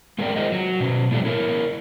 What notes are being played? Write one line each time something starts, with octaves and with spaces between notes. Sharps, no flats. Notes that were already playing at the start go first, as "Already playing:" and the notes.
G#3 A3 G#4 A#4 D5 G5
F4 G#4 A#4 C5 D#5
F#3
B2 C#4
A#2 E3 F3 G3 A3
E4 A#4 C#5